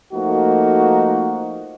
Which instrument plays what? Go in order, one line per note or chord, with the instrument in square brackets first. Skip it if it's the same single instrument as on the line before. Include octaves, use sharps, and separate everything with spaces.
[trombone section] F3 A3 A#3 D#4 F#4